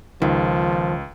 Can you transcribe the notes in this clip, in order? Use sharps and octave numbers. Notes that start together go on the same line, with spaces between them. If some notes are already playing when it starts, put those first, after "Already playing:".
C#2 D#3 F3